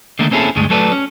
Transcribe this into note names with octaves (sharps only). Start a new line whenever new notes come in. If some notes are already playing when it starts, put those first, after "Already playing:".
D3 D#3 A3 A#3
A#3 C4 C#4 E4 G#4 A4
D2 G2 G#3 A3
F#3 A3 A4 B4 D5
C#4